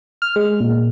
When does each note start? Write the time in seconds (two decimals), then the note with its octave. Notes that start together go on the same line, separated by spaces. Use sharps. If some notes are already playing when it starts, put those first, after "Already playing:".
0.22 F6
0.36 G#3
0.60 A#2